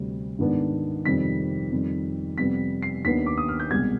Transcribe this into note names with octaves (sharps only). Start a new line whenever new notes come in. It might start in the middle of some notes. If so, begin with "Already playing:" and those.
Already playing: D2 C3 G3 C4
G#2 D#3 B3 D4
F2 C3 D#3 G3 C4 B6
F2 D#3 G3
F2 C3 G3 B3 B6
C7
D#2 D#3 B3 D4 B6
D6
D#6
F6
G6
C2 B2 G#3 G#6